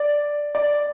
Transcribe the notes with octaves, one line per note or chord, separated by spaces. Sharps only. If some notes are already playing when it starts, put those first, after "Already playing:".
Already playing: D5
D5